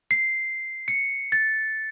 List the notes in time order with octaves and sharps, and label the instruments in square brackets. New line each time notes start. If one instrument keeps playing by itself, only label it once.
[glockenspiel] C7
C#7
A6